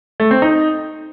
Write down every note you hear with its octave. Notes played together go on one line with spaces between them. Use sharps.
A3
C4
D#4